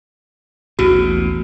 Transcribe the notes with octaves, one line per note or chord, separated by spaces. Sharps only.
A1 D#2 B2 F#4